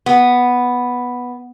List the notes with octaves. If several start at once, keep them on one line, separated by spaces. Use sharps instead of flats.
B3